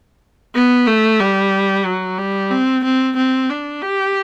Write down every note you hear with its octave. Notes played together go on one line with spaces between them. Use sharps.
B3
A3
G3
F#3
G3
C4
C4
C4
D4
G4